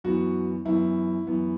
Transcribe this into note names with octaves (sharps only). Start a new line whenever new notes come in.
F#2 E3 B3 F#4
F#2 E3 B3 E4
F#2 E3 B3